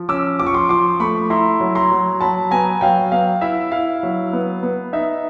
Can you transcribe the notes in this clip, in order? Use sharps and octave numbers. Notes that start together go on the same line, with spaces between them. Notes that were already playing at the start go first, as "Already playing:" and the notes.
Already playing: F3
C#4 D6 E6
F3 D6
C#6
C6 D6
F3 C6 D6
A3 B5 C#6
E4 A#5 C6
F#3
A#5 C6
F#3
F#3 A5 B5
B3 G#5 A#5
F#3 F5 G5
B3 F5
E4 E5
E4 F5
F#3
B3
B3
D#4 E5